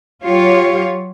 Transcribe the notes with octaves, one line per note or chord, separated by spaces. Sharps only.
F#3 F4 G4 C#5